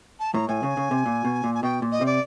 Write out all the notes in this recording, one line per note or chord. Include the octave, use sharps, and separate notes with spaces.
A5
A2 A#5
A2 G#5
C#3
C#3
C3
A#2
B2
A#2
G#5
B2 G5
A#2
D#5
C3 D5